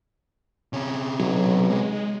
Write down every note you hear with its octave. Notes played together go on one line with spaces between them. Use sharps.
C3 C#4
B1 F#3
G#3